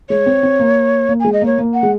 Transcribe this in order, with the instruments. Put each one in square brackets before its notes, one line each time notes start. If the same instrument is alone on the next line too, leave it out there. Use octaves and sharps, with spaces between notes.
[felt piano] G#3 [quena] C#5
[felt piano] C4
C4
A#3
A#3
[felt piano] G#3 [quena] G#5
[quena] D#5
[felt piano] A#3 [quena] C#5
[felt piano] A#3
[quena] F#5
[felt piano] G#3